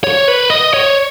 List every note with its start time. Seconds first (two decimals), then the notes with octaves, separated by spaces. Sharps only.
0.04 C#5
0.28 B4
0.50 D#5
0.74 C#5